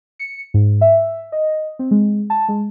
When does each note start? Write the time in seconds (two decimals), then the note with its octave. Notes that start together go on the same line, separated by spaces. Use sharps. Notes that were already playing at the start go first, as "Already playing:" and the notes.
0.19 C#7
0.54 G#2
0.81 E5
1.32 D#5
1.79 C4
1.91 G#3
2.30 A5
2.49 G#3